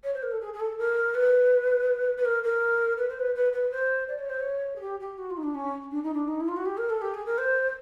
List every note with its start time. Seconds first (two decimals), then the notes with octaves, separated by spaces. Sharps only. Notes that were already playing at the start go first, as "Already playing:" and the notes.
0.03 C#5
0.14 C5
0.22 A#4
0.31 A4
0.41 G#4
0.53 G#4
0.60 A4
0.78 A#4
1.14 B4
2.17 B4
2.25 A#4
2.43 A#4
2.97 B4
3.09 C5
3.19 B4
3.35 B4
3.52 B4
3.71 C5
4.08 D5
4.18 C#5
4.29 C5
4.39 C#5
4.75 G#4
4.80 G4
5.00 G4
5.18 F#4
5.30 F4
5.37 D#4
5.43 D4
5.54 C#4
5.91 D4
6.03 D#4
6.13 D4
6.28 D#4
6.40 E4
6.48 F4
6.56 F#4
6.65 G4
6.77 A#4
6.89 A4
7.01 G4
7.14 G#4
7.26 A#4
7.38 C5